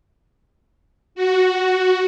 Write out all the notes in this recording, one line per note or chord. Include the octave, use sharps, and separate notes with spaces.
F#4